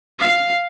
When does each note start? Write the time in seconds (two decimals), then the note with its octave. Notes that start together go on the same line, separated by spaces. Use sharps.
0.19 F5